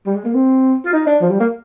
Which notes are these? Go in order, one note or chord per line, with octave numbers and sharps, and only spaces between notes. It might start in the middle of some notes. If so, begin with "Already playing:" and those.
G3
G#3
A#3
C4
F4
D#4
D4
F3
G3
A#3